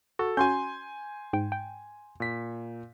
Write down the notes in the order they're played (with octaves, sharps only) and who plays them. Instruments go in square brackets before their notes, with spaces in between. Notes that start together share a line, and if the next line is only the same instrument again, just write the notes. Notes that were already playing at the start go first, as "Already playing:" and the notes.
[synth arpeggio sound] F#4 [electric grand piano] A4
[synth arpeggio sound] C#4 F#4 [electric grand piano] G#5 C6 G6
[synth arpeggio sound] G#2 G5
G5
[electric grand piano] A#2 B6